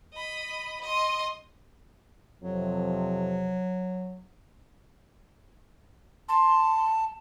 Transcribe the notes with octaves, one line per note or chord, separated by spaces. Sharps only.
D#5 B5
D#5 C6
F2 C3 F#3
A5 C6